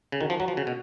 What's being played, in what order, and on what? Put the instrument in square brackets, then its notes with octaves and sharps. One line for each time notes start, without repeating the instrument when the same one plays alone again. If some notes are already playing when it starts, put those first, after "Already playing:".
[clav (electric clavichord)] C#3
[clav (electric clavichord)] D#3 [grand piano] F#4
[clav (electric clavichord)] F3
[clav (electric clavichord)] F#3 [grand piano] F#4
[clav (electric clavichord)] F3
C#3
B2